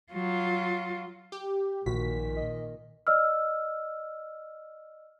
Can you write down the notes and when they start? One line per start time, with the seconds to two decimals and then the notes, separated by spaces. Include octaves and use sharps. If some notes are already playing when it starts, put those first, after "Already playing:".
0.13 F#3 F4
1.32 G4
1.86 A#1 A#2 D#3 F#4 B6
2.37 D#5
3.07 D5 D#5 E6 F6